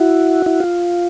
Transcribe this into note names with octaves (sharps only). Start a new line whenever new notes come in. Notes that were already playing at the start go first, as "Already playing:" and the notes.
Already playing: E4 F#4
E4
F4